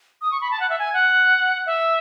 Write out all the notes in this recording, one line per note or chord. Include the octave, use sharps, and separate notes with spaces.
D#6
C#6
B5
A5
F#5
E5
G#5
F#5
E5